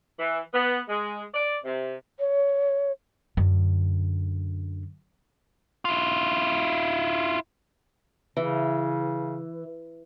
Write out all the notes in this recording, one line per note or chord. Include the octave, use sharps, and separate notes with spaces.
E3
B3
G#3
D5
C3
C#5
F#2 D3
E4 F4
C#3 E3